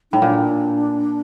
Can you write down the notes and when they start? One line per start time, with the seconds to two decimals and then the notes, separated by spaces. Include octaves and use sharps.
0.12 A2 D#4
0.22 A#2 D4